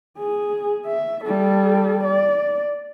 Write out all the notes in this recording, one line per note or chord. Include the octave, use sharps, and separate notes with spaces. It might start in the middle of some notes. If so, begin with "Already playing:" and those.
G#4
E5
G3 A4
D5